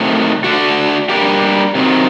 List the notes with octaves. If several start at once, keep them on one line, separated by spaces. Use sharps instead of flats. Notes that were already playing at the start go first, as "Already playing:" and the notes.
Already playing: C3 D#3 F#3 A3
D3 A3 D4 F#4
G3 A#3 D4 G4 A#4
C3 D#3 F#3 C4